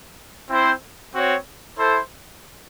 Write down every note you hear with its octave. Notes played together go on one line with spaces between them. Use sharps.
C4 E4 C5
C4 F#4 C#5
E4 A4 C5